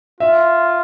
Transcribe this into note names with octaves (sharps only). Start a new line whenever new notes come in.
F4 E5